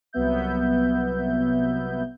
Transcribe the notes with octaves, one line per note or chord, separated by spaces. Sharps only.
C2 F#3 B3 E5 G6